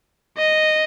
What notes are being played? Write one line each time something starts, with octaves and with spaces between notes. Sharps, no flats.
D#5